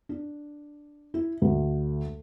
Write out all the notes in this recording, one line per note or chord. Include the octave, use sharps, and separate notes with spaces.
D4
E4
D2